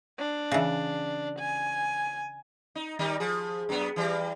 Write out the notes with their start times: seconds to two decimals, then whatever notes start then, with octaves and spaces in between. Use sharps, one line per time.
0.19 D4
0.51 C#3 E3
1.39 G#5
2.75 D#4
2.99 D#3 G3 D#4
3.20 F3 G#4
3.69 F#2 B3
3.96 E3 G3